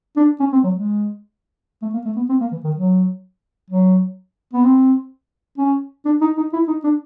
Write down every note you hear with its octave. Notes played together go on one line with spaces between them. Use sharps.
D4
C#4
C4
F#3
G#3
A3
A#3
A3
B3
C4
A#3
E3
D#3
F#3
F#3
B3
C4
C#4
D4
D#4
D#4
E4
D#4
D4